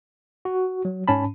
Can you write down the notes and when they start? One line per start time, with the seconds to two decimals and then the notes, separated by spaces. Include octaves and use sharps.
0.45 F#4
0.85 F#3
1.08 G#2 C#4 A5 B5